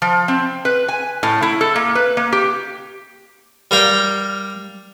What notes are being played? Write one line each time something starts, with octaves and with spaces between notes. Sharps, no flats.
F3
C4
B4
G#5
A2
E4
A4
A#3
B4
A#3
G4
G3 A#4 F5 G5